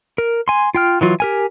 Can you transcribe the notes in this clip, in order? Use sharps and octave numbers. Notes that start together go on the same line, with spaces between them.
A#4
G#5 C6
F4 G5 F6
E3 F#3 F4
G4 A#4 G#5